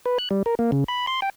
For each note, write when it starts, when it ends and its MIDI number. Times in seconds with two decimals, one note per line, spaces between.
0.06 0.18 71
0.19 0.29 90
0.31 0.43 55
0.46 0.55 70
0.59 0.71 58
0.72 0.84 49
0.88 1.06 83
1.07 1.20 84
1.22 1.30 79